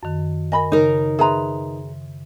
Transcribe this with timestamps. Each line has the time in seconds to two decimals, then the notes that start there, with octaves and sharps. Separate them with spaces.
0.03 F#2 D#3
0.52 A#4 D#5 G#5 B5
0.72 C#3 D#4 A#4
1.19 G#4 B4 E5 A#5 C6